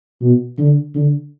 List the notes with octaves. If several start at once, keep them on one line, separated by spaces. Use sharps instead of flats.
B2
D3
D3